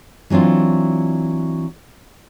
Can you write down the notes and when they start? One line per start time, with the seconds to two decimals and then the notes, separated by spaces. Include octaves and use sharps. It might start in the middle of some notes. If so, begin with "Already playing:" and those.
0.30 E3 F#3 C4 D4 F4